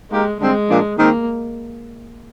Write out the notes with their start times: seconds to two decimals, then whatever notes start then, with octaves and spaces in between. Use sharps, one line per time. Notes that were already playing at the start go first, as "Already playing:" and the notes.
0.11 G#3 A#3 D#4 G4 A#4
0.40 D3 G3 G#3 C4
0.69 A#2 F3 A#3 D4
0.98 D#3 G#3 A#3 C4 D#4 A#4